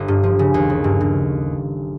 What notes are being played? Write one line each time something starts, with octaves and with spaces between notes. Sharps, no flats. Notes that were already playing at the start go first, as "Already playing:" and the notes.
Already playing: G1
G2
F3
C#3
D#2
C#3
G2
G2